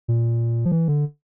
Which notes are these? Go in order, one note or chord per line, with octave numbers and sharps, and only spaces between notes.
A#2
F3
E3
D3